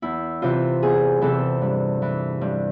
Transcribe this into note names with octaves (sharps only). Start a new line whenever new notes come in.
E2 E4
C3 E3 F4
E2 G#4
C3 E3 A4
G2
E3
G2